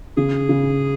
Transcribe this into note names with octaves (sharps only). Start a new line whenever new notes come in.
C#3 G#4
C#3